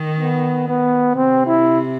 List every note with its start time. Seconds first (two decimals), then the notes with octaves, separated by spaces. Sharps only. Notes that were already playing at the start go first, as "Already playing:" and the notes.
Already playing: D#3
0.20 B3
0.68 B3
1.15 C3 C4
1.46 E4